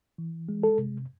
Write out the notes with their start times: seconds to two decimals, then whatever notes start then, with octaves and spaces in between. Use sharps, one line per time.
0.18 E3
0.49 G#3
0.63 A4
0.78 C3